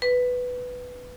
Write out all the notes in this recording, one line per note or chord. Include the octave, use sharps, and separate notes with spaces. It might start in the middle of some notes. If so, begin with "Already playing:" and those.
B4